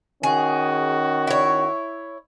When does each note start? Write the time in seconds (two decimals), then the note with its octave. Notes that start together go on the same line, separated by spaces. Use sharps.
0.23 D#3 C#4 F#4 G#4
1.27 E4 C#5